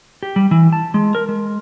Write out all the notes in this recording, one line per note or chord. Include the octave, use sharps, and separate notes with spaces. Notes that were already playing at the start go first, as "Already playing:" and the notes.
G4
G3
E3
A5
G#3
A#4
G#3